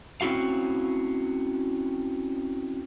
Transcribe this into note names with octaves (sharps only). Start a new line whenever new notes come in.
C4 C#4 E4 F#4 F5